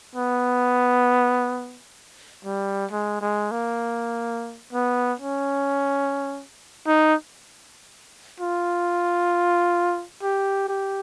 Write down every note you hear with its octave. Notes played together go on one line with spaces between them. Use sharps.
B3
G3
G#3
G#3
A#3
B3
C#4
D#4
F4
G4
G4